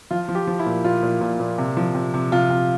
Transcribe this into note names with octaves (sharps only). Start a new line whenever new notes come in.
F3 F4
F3
G4
F3
E4
A#2
A#2 F4
A#2
A#2
A#2
C3
F3
C3
C3
C3 F4
C3